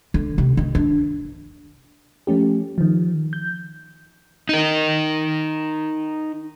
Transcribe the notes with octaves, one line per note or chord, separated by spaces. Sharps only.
D3
C3
D#3
D4
F3 A3 C#4 G4
D#3 F3
G6
D#4 A#4